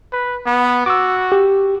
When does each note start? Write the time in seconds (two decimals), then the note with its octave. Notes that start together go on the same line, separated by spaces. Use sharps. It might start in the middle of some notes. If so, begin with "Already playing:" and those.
0.13 B4
0.46 B3
0.86 F#4 D6 E6
1.32 G4